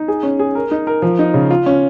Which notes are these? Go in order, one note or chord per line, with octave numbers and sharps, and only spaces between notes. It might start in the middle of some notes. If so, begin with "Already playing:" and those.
Already playing: D#4
G#4
C#4
G#4
A#4
D#4
A#4
F3
D#4
C#3
F4
C#4